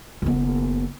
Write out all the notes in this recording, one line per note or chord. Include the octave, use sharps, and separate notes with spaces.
F#1 B3